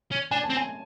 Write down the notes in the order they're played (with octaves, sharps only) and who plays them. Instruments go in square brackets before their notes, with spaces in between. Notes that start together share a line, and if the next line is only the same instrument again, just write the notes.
[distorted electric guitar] C#4
[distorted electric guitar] D4 [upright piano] G#5
[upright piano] A5
[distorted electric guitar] C4
[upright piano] G#5